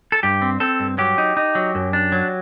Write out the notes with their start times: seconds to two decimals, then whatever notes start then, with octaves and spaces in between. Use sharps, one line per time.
0.12 A4
0.23 G2 G4
0.42 C4
0.60 C4 A4
0.80 G2
0.98 F#3 G4
1.18 D#4
1.37 D#4
1.55 F#3
1.75 F#2
1.93 D4
2.12 F#3